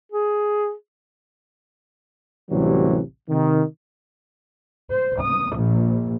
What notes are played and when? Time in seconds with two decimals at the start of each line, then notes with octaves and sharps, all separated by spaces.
0.12 G#4
2.51 A1 D2 C3 E3 F#3 G3
3.29 C3 D#3
4.92 C5
5.21 D#6
5.57 A#1